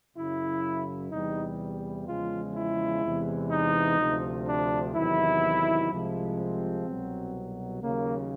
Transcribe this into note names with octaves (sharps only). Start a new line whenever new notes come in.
F#2 C#3 F#3 E4
E2 C3 E3 G3 D#4
E2 C#3 F3 G#3 F4
E4
E2 C3 E3 G#3
D#4
D2 C3 F3
D4
E2 C3 D#3 F#3 E4
C2 C3 F3 G#3
C4
C2 B2 F#3
D#2 C#3 F#3 A#3